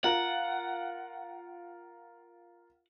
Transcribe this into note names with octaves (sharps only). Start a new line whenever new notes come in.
F4 A#4 F#5